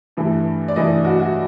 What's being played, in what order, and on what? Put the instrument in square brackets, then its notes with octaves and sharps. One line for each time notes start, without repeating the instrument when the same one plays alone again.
[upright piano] G2 E3 A3
D5
G2 E3 A3 D#5
F#4
F#4